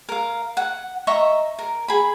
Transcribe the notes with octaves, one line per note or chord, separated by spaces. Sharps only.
A#4 F5
F#5
D#5 E5 A#5 C#6
A#4
G#4 B5